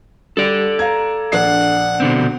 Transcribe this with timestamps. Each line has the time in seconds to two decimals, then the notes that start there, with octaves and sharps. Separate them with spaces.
0.37 G3 A4 D5
0.79 F5 A#5 G#6
1.32 A#1 D4 F#5 C7
2.00 B2 D3 C4